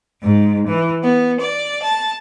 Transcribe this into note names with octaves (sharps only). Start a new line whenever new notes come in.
G#2
E3
B3
D5
A5